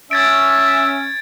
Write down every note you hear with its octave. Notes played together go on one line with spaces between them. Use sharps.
C#4 E5 G#6 A6 D7